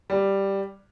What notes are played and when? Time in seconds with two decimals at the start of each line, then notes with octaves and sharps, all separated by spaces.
0.10 G3